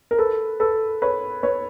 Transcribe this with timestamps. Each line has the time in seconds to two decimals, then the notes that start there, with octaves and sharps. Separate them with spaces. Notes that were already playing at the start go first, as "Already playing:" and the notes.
0.11 A#4
0.18 A4 B4
0.60 A4 B4
1.02 B4 C#5
1.43 B4 C#5